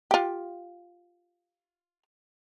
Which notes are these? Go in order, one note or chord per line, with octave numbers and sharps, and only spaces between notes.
F4 G4